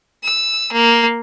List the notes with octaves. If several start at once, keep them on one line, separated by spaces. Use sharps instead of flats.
E6
A#3